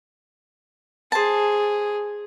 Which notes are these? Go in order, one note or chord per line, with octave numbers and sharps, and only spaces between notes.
G#4 C5 A5